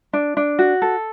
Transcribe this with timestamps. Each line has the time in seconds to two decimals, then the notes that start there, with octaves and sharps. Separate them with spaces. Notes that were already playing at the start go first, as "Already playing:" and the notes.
0.13 D4
0.37 D4
0.59 F#4
0.82 A4